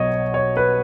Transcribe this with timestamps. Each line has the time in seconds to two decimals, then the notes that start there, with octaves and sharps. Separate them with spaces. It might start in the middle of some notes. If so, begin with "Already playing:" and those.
Already playing: B1 B2 F#3 C#5 D#5
0.34 C#5
0.57 B4